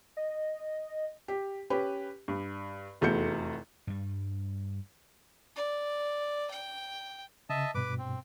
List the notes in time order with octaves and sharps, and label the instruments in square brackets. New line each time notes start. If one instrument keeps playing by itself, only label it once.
[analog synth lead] D#5
[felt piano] G4
C#4 G4 B4
G2
F1 E2 A3 F#4 G6 C#7
[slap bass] G2 G3
[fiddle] D5
G5
[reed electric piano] C#3 [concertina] D#5 E5 A5
[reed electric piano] G2 B2 [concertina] B4 D6
[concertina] C4